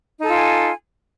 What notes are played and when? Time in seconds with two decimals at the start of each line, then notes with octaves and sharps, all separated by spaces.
0.18 D#4
0.23 A4
0.28 F4
0.33 G#5